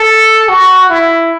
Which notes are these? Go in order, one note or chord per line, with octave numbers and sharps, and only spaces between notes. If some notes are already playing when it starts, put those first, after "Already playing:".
Already playing: A4
F#4
E4